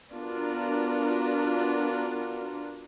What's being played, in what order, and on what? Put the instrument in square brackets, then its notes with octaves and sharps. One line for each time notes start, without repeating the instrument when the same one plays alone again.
[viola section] B3 D4 F4 F#4 A#4